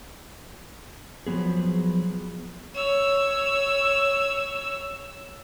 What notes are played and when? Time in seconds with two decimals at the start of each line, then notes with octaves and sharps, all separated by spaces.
1.27 F3 F#3 B3 G#4
2.75 C#5 E6